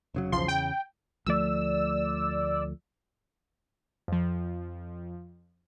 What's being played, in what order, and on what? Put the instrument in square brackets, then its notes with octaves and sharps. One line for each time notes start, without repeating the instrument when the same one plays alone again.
[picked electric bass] F1 C#3 F#3
[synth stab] B1 F3 C6 [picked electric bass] E2 C#3
[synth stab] G5
[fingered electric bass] D2 F3 A3 [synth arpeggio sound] D5 E6
[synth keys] F2 F3